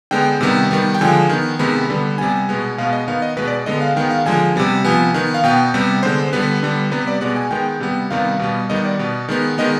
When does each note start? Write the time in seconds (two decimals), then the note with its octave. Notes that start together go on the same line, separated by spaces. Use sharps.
0.11 D3 G#3 B3 G5
0.41 C3 D#3 G3 B3
0.71 D#3 G3 B3
0.94 G5
1.01 D3 F3 G#3 G#5
1.29 D#3 B3
1.59 C3 D#3 G#3 B3 B5
1.90 D3 G3 B3
2.18 C3 G3 B3 G#5
2.49 B2 G#3 B3
2.78 B2 G#3 B3 F5
2.93 D#5
3.08 D#3 B3 F5
3.22 D#5
3.37 B2 G#3 B3 B4
3.48 D5
3.66 D3 G#3 B3 D#5
3.81 F5
3.96 D#3 G#3 B3 G5
4.10 F5
4.26 D3 F3 G#3 G#5
4.55 C3 G3 B3
4.85 C3 F3 B3 G#5
5.14 D#3 B3
5.34 F5
5.44 B2 B3 G5
5.74 C3 G3 B3
6.03 D3 G#3 B3 C5
6.33 D3 G3 B3 B4
6.63 D3 G3 B3
6.91 C3 G3 B3 B4
7.07 D5
7.21 B2 G#3 B3 D5
7.36 G#5
7.51 D#3 G#3 B3 G5
7.80 C3 G3 B3
8.10 C3 D#3 G3 B3 F5
8.39 B2 G3 B3
8.69 D#3 G3 B3 D#5
8.85 D5
8.99 B2 B3
9.28 D#3 G#3 B3
9.58 D#3 G#3 B3 D#5